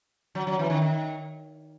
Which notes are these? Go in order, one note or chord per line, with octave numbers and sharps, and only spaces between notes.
F#3
F#3
E3
D#3
D#3